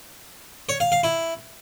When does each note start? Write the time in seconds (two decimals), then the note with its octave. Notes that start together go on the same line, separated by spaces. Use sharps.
0.69 C#5
0.80 F5
0.92 F5
1.03 E4